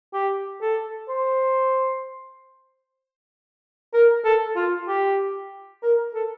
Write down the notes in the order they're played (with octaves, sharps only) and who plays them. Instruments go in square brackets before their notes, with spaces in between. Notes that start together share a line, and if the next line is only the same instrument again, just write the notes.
[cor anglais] G4
A4
C5
A#4
A4
F4
G4
A#4
A4